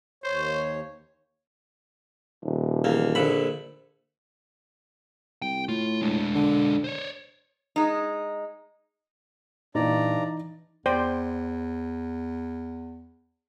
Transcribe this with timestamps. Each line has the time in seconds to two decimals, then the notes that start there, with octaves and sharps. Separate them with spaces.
0.24 D#2 C5 C#5
2.44 D#1
2.84 E2 A#3
3.15 A#1 D3 B5
5.42 C2 G5
5.69 A2 F4
6.02 G#3 D4
6.35 D3
6.84 C5 C#5
7.76 G#3 D#4
9.75 G2 A#2 E3 D#4 D5 A#5
10.86 E2 C5 D5 G5